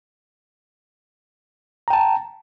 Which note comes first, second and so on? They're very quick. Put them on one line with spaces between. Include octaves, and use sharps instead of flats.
A#5 G5 A5